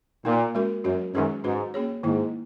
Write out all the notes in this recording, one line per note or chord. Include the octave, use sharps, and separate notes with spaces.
A#2 A#3 D#4 A#4
G#3 C#4 F#4 A#4
F#2 F#3 C#4 F#4 A#4
F#2 D#3 G#3 D#4 G#4 B4
G#2 C#4 F#4 B4
A#3 C#4 G#4 C#5
G#2 D#3 A#3 E4